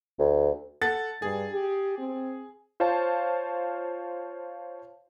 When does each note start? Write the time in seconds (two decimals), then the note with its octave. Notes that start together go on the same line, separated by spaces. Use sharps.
0.19 D2
0.81 A4 F#5 A6
1.22 G2 G#4
1.52 G4
1.98 C4
2.80 F4 C5 C#5 F5 A5